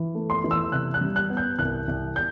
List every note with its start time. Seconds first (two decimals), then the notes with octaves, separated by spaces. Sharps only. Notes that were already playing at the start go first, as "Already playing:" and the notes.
Already playing: E3
0.15 A3
0.30 C6
0.44 E3
0.51 E6
0.72 C3 F#6
0.94 F#6
1.01 G3
1.16 F#6
1.30 B3
1.37 G6
1.59 C2 F#6
1.87 C2
2.16 G6